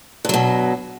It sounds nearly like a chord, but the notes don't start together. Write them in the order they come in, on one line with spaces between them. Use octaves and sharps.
G2 F#3 B2